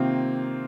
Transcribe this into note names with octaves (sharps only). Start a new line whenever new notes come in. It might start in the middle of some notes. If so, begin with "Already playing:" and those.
Already playing: C3 D#3 A#3 C4 F4